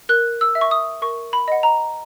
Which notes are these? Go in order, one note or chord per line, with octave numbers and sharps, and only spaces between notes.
A#4 F#6
E6
E5
C#6
D#6
A#4 C#6
B5
D#5 F#5
A#5